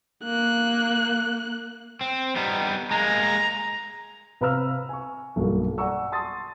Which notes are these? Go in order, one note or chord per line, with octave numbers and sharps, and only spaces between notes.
A#3 F#6
C4
G3 B3 D#4
G#3 A#3 A#5
C3 B4 F5 A#5 E6 F6
G#5 C#6
B1 G2 F#3 A#3 F#4
D5 F#5 G#5 A#5 C#6 E6
A5 C6 D#6 A6